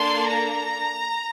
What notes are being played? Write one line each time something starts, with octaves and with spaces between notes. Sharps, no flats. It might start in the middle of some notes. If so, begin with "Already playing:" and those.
Already playing: A#3 D4 A4 C6
A#5